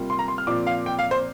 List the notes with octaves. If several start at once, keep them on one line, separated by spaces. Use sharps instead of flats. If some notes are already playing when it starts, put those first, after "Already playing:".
Already playing: C3 G3 A#3 F4
C6
A#5
C6
F6
A#2 F3 C4 F4 D6
F5
G5
F5
C5